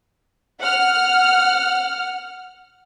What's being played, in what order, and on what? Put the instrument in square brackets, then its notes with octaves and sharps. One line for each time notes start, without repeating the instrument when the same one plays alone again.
[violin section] F#5 F6